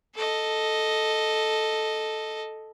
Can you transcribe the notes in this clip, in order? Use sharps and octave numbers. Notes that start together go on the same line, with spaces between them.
A4 D#5